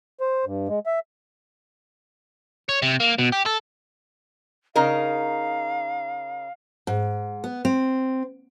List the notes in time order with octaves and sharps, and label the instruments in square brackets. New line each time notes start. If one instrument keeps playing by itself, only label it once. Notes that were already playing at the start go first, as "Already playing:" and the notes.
[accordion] C5
G2
G#3
E5
[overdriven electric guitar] C#5
C3
A#3
B2
G4
A4
[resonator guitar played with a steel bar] C#3 D#4 A#4 [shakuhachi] F5
[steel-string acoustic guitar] G#2
B3
C4